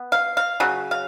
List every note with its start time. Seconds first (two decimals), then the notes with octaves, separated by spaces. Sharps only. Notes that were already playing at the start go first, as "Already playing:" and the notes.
Already playing: B3
0.12 F5
0.37 F5
0.60 C#3 F#3
0.91 F5